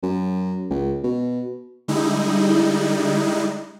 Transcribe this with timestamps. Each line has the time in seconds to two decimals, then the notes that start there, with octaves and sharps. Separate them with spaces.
0.03 F#2
0.70 C#2
1.04 B2
1.88 D3 G3 G#3 D#4 E4